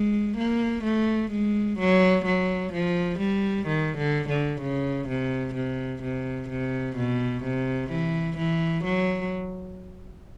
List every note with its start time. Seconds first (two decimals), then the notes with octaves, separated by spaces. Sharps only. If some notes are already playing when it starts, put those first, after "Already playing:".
Already playing: G#3
0.37 A#3
0.84 A3
1.31 G#3
1.79 F#3
2.25 F#3
2.73 F3
3.19 G3
3.67 D#3
3.98 D3
4.29 D3
4.61 C#3
5.08 C3
5.55 C3
6.02 C3
6.49 C3
6.96 B2
7.44 C3
7.90 E3
8.37 E3
8.84 F#3